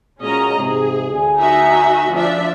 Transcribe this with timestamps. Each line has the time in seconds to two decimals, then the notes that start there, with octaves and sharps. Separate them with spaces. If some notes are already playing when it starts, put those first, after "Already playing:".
0.21 A#2 G#3 C#4 F#4 D#5 A#5
0.57 G#2 C3 E3 G#4
1.10 D2 G#5
1.39 D#4 F#4 E5
2.14 F3 D4 E5